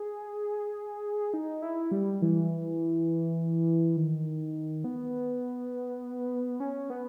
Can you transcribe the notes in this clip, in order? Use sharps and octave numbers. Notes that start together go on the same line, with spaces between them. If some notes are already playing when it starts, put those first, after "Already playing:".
Already playing: G#4
D#4
E4
G3
E3
D#3
B3
C#4
B3